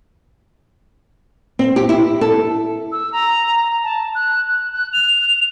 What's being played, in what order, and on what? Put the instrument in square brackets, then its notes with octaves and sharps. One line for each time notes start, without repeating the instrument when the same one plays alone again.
[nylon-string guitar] C4
G4
E4
A4
[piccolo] E6
A#5
A5
F#6
F#6
F#6
F7